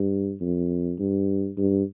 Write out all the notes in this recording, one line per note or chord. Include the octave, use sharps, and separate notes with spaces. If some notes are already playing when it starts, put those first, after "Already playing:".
Already playing: G2
F2
G2
G2